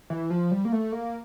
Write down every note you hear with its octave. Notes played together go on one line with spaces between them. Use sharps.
E3
F3
G3
A#3
A3
A#3